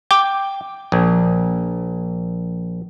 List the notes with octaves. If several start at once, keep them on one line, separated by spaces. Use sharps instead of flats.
G5 D6
A#1